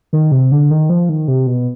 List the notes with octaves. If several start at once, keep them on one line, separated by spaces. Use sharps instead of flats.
D#3
C3
D3
D#3
F3
D#3
C3
B2